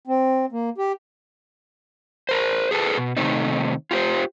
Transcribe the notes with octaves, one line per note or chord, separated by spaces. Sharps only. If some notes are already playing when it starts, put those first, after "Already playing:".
C4
A#3
G4
A#4 C5
G#4 A4 B4
B2
C3 D#3 A3 C4 D#4
F4 G4 B4 C5